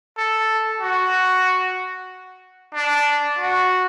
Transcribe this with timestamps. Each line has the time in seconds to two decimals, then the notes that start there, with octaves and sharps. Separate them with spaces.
0.17 A4
0.81 F#4
2.74 D4
3.38 F#4